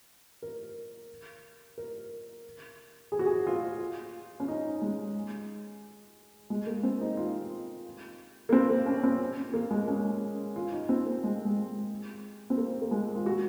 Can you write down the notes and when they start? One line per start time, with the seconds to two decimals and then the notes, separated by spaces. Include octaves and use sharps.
0.42 A#4
1.78 A#4
3.12 G#4
3.19 F#4
3.26 G#4
3.47 F4
4.40 C#4
4.48 D#4
4.82 G#3
6.50 G#3
6.67 A#3
6.83 C4
7.01 D#4
7.17 F4
8.49 A#3
8.53 C4
8.70 A#3
8.86 C#4
9.03 C4
9.54 A#3
9.71 G#3
9.88 C#4
10.56 F4
10.72 D#4
10.89 C4
11.06 A#3
11.24 G#3
11.45 G#3
12.50 C4
12.57 A#3
12.82 A#3
12.91 G#3
13.16 F4
13.26 F#4